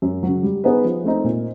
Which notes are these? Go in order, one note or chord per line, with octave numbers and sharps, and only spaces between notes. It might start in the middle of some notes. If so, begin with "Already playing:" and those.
F#2
C#3 F#3
G3
B3 D#4 G#4 B4
F3
A3 C4 D#4
A#2